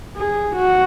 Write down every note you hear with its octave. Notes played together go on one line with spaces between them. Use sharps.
G#4
F#4